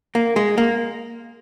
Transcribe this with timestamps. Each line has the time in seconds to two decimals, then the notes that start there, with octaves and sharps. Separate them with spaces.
0.15 A#3
0.36 G#3
0.58 A#3